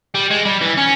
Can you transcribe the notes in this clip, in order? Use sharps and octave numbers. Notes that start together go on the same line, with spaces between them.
G3
G#3
G3
E3
C#4